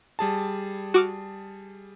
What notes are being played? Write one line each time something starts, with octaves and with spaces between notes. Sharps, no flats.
G3 G#4 A5
F#4 D6 F6